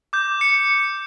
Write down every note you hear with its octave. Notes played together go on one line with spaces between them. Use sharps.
D6 G6
C#7